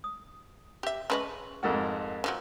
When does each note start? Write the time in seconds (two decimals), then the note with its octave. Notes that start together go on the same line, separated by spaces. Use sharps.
0.04 D#6
0.83 G4 E5
1.10 C#3 B4 D#5 A5 C6 C#6
1.63 F2 G#2 F#4 A#4 F5 F#5
2.24 D3 F3 F#3